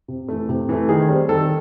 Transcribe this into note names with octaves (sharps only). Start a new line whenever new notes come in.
C3
E3 A3
C3
E3 A3
D#3 G#4
G3 C4
D#3 A4